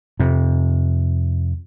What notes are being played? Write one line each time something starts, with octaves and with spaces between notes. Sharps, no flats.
F2 C3